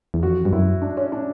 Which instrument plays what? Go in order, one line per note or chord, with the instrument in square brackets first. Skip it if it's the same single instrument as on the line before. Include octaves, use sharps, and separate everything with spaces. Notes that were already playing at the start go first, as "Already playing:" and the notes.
[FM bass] E2
[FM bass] F2 [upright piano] F#4
[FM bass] G2
[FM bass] F#2 [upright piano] E4
[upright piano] D4
C#4
D4